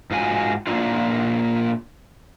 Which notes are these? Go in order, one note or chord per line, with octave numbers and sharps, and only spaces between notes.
G#2 F4 F#4 G#5
A#2 D#3 A#3 D4 E4 F4